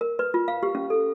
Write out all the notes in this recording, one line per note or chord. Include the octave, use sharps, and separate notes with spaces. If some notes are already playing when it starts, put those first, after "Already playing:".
A#4
B4
F4
F5
G4
C#4
A4